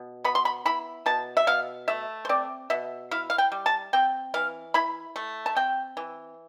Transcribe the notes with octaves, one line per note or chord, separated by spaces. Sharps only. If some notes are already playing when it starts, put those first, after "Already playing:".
Already playing: B2
B3 B5
C6
B5
E4 B5
B2 A5
E5
B2 F5
A3 E5
C5
C4 D5
B2 E5
E4 F5
F5
G5
G3
A5
C4 G5
E3 F5
E4 B5
A3
A5
C4 G5
E3